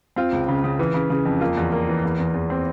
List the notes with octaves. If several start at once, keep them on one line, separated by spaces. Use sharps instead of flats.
C4 F4
C#2
C#3
C#3
E3
C#3
C#3
F2
A#3 F4
E2
A#3
E3
E2
E2
E2
C4